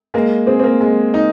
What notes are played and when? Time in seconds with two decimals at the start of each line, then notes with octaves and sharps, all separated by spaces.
0.14 G#3 A#3
0.47 C4 G#4
0.59 C4
0.64 A#3
0.81 G#3
1.14 D#4